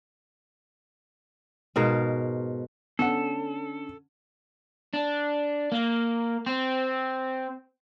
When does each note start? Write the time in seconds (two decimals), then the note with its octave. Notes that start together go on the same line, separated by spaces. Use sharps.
1.76 G#2 B2 A#4 F5
2.99 D3 B3 C#4 A4 F#5
4.94 D4
5.72 A#3
6.47 C4